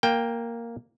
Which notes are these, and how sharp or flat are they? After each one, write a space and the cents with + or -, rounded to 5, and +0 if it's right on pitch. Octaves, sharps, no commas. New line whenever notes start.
A#3 +0 G5 +10